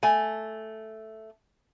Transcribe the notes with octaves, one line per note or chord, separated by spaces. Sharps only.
A3 G#5